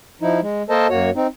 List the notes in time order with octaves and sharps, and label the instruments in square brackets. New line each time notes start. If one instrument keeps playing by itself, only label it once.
[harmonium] F3 D#4 E4
G#3
A#3 A4 A#4 C5 D#5 A5
F#2 A#3 F#4 C#5
C4 D#4